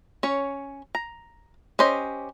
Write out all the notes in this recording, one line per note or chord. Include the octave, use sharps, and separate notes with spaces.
C#4 C#5
A#5
C#4 G4 C5 D#5